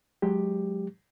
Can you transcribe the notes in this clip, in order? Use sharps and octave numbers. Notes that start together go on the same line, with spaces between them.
F#3 G#3 G4